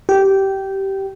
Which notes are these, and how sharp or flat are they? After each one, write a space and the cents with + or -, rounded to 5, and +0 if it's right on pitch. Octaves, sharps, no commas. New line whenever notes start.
G4 -15